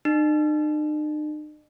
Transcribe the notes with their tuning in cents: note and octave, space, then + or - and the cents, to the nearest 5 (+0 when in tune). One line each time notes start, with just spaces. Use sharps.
D#4 -45